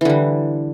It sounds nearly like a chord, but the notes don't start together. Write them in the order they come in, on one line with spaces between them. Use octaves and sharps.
E3 D3 G3